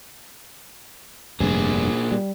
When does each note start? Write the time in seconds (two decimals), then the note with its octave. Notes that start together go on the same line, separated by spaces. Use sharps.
1.40 F1 G2 A#2 G#4
2.12 G3